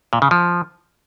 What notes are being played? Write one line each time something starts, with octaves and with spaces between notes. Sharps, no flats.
A#2
C#3
F3